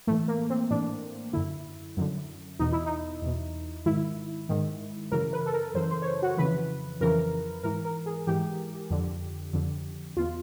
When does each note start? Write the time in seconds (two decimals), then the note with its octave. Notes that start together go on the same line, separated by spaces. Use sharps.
0.07 A2 E3 A3
0.28 A#3
0.50 C4
0.71 A2 E3 D4
1.33 F#2 D3 E4
1.97 F#2 D3
2.60 E2 B2 D#4
2.72 E4
2.86 D#4
3.22 E2 B2
3.86 G#2 D#3 E4
4.49 G#2 D#3
5.12 F#2 C#3 E3 A#4
5.33 B4
5.46 A4
5.54 A#4
5.74 F#2 C#3 E3 C5
5.91 C5
6.02 C#5
6.07 C5
6.22 F#4
6.38 F2 C#3 E3 B4
7.01 F2 C#3 E3 A#4
7.64 G#2 E3 A#4
7.85 A#4
8.06 G#4
8.27 G#2 E3 G4
8.90 F2 D3
9.53 F2 D3
10.16 E2 B2 F4